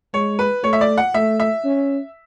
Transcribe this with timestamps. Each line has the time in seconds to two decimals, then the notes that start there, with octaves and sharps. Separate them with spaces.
0.14 G#3 C#5
0.39 B4
0.64 A3 C#5
0.73 E5
0.81 D5
0.97 F#5
1.14 A3 E5
1.40 E5
1.64 C#4